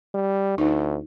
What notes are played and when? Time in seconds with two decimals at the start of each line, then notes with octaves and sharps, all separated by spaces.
0.15 G3
0.58 D2 D#4